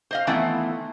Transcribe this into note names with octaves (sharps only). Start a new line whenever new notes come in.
C5 D#5 F5
D#3 E3 A3 B3 C4 E4